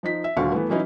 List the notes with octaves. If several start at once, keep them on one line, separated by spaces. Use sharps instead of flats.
F3 D#4 B6
E5
D#1 D2 D3 F#4 F5 C#6
E3 A3 B3
E3 F#3 C#4 D#4 E4